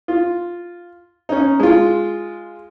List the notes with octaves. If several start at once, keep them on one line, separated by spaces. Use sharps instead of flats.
F4
C#4 D#4
G#3 F4